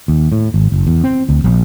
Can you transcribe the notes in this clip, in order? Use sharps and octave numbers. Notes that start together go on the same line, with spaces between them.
D#2
A2
G#1
F#1
E2
C4
D2
A#1